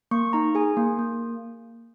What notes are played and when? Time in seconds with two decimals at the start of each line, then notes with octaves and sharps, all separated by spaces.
0.11 A#3 C#6
0.33 D#4 A#5
0.55 G#4 G#5
0.77 A#3
0.99 A#3